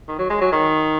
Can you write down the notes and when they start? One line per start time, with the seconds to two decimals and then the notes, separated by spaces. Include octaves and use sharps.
0.08 D#3
0.19 F#3
0.30 G#3
0.41 F#3
0.52 D#3